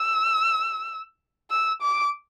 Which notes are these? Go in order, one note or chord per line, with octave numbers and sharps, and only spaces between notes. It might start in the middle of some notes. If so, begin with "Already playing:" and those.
Already playing: E6
E6
D6